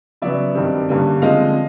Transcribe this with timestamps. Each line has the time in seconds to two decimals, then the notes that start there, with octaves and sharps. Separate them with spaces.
0.22 C#3 F#3 B3 D5 E5
0.55 G2 D#3 G3 C4
0.89 G2 D3 G3 A#3 C#4
1.22 D3 F3 G#3 C4 D#5 F5